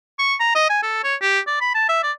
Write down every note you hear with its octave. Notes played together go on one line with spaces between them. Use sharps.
C#6
A#5
D#5
G#5
A4
C#5
G4
D5
B5
A5
E5
D5